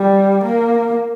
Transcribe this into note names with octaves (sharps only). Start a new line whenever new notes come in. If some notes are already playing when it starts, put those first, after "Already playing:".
Already playing: G3
A#3